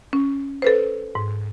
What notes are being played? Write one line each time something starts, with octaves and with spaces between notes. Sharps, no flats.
C#4
A4 B4 C5
G#2